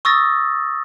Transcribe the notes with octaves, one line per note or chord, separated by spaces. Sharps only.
C#6 D#6 E6 A6 A#6